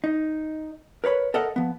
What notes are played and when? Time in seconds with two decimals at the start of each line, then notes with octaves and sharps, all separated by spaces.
0.04 D#4
1.04 A#4 B4 C#5 B5
1.34 A4 A#4 D#5 E5 F#5
1.56 F3 B3